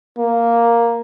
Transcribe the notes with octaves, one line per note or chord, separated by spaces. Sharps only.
A#3